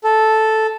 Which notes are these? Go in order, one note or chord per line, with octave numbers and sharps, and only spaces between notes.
A4